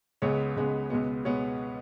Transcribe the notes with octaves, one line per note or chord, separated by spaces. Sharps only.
C#2 C#3 G#3 B3 C#5
C#2 C#3 G#3 B3
C#2 B2 G#3 B3
B2 G#3 B3 C#5